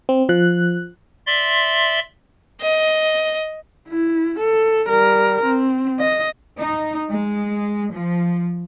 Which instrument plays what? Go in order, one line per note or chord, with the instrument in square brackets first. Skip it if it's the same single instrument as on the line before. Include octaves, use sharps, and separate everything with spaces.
[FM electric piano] C4
F3 F#6
[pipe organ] D5 E5 C6
[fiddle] D#5
[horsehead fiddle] E4
A4
G3 A#4
C4
D#5
[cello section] D#4
G#3
F3